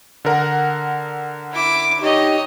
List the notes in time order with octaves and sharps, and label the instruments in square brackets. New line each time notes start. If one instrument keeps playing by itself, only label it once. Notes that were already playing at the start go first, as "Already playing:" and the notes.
[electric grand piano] D3 A#4 F#5
[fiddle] E4 D6
[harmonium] D#4 G4 [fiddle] C#5 D#5